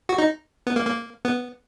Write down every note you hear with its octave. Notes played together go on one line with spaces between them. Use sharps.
F#4
D#4
B3
A#3
A#3
B3